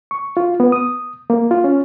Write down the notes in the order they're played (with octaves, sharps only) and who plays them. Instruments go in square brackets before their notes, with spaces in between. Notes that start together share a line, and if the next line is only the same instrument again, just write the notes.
[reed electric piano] C#6
F4
B3
D#6
A#3
F4
C#4